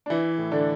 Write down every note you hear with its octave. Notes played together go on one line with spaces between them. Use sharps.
D4
E3 E4
A2
D3 D4